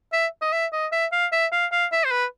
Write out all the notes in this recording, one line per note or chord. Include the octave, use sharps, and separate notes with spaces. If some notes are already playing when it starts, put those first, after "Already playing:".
E5
D#5
E5
D#5
E5
F5
E5
F5
F5
E5
C5
B4